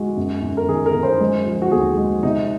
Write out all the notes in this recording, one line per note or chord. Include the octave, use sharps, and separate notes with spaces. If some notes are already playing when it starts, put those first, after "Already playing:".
Already playing: G#3 F#4
F#2
F#2
A#4
D#3 G#4
A#4
F#2
C5
G#3
F3
F#4
D#2 G#4
G#3
C3 D#4